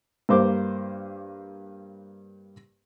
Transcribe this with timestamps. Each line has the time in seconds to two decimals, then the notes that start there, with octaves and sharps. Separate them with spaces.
0.29 G2 A#3 C5 D6